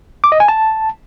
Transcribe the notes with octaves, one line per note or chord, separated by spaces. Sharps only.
D6
D#5
G#5
A5